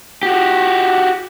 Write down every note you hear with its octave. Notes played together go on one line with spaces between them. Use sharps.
F#4 G4